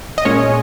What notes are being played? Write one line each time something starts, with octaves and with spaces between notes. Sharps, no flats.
D#5
A#2 G#3 C#4 C#5